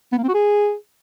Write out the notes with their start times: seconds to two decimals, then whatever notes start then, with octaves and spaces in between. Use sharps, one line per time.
0.12 B3
0.18 A#3
0.23 C4
0.29 F#4
0.34 G#4